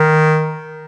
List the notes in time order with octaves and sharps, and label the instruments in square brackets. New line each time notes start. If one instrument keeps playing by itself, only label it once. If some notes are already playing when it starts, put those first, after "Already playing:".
Already playing: [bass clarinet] D#3